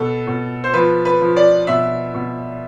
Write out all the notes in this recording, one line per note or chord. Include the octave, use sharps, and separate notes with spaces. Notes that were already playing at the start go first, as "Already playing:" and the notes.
Already playing: B2 A4
B2
C5
F3 B4
B4
F3
D5
B2 E5
B2